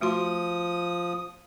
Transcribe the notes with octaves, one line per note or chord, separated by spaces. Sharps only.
F3 A3 F#4 C6 D#6